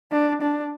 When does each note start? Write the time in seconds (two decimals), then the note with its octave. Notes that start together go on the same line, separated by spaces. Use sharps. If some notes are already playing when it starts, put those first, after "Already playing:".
0.12 D4
0.42 D4